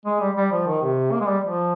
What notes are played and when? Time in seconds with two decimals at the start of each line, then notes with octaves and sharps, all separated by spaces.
0.05 G#3
0.20 G3
0.36 G3
0.52 F3
0.67 D#3
0.82 C3
1.12 A#3
1.20 G#3
1.28 G3
1.44 F3